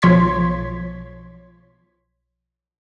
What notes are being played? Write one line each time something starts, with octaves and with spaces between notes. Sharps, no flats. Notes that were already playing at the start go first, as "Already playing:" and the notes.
B1 F3 C#5 C6 G#6 B6